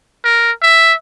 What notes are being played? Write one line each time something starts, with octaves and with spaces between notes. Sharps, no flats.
A#4
E5